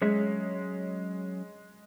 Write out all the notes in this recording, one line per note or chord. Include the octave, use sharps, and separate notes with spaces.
F#3 G#3 C#4 G#4 C#5 E5